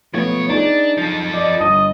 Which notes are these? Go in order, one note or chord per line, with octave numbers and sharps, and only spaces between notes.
B1 F3 A3 B3 C#5
D4 D#4 G#4
F3 A4
D5 D#5
G1 D#5 A5 D#7